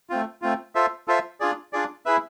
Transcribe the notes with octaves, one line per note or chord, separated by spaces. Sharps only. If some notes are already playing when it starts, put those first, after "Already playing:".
A3 C4 F4
A3 C4 F4
F4 A4 C5 E5
F4 A4 C5 E5
D4 F4 G#4 D5
D4 F4 G#4 D5
E4 G#4 B4 E5